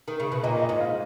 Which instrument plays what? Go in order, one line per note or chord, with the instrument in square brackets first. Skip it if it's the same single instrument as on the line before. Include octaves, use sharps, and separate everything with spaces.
[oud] D#3
C#3
B2
[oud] A#2 [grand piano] D#5
[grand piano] D#5
[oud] G#2
[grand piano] F5